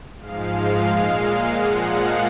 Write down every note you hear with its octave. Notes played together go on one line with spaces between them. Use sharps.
G#2 F3 G#3 F5
A#2 G#3
A#2 F3 G#3 F#5
F5